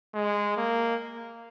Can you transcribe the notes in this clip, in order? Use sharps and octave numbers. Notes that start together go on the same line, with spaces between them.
G#3
A#3